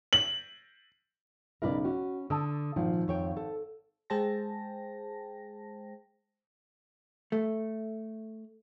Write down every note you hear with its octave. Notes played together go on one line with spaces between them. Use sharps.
F#7
B1 C#3 D#4 A#4 B4 D5
C#4 F#4
D3 A5 D#6 E6
G#1 A#2 F3
F2 C#5 G5
A4
G#3 G#4 C5 G5 A5 A#6
A3